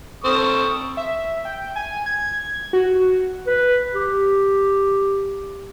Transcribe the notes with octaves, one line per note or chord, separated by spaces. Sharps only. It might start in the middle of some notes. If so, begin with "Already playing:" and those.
C4 A4 C#6 D#6
E5
G5
G#5
G#6
F#4
B4
G4